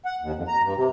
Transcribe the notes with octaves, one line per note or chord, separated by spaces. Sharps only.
F#5
D#2
F2
A#5
G2
C3